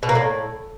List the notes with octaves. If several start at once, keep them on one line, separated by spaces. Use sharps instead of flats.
B2
A#3
A2